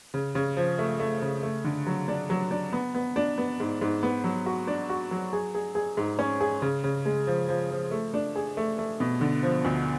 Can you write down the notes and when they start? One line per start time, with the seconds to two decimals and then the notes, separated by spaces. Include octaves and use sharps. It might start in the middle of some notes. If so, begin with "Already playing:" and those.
0.14 C#3
0.35 C#3
0.57 F3
0.79 A3
1.00 A3
1.22 C#3
1.43 A3
1.64 D3
1.87 F#3
2.08 D4
2.30 F#3
2.51 D4
2.73 B3
2.95 B3
3.16 D4
3.38 B3
3.60 G#2
3.81 G#2
4.03 B3
4.24 F#3
4.46 F#4
4.67 D4
4.90 F#4
5.11 F#3
5.33 G#4
5.55 G#4
5.75 G#4
5.97 G#2
6.19 C#4
6.41 G#4
6.62 C#3
6.84 C#3
7.05 G#3
7.27 F3
7.49 F3
7.71 F3
7.91 A3
8.14 D4
8.36 G#4
8.57 A3
8.78 A3
9.00 B2
9.21 D3
9.43 F3
9.65 D2